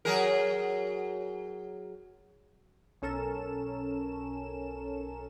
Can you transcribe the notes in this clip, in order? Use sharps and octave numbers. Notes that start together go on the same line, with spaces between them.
F#3 G#4 A#4
B1 C#4 A4 A#4 E7